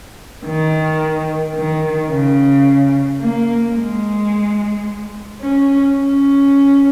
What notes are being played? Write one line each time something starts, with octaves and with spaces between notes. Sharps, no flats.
D#3
D#3
C#3
A#3
G#3
C#4
C#4